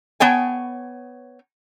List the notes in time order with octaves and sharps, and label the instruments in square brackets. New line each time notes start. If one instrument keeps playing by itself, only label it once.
[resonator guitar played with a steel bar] B3 C#5 G5 G#5